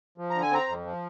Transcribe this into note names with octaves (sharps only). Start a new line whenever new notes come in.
F3
D3 A#5
G#5
C4 A#5
F2
F3